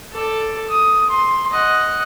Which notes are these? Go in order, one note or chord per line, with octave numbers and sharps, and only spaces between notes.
A4 D5
D#6
C6
D#5 F#5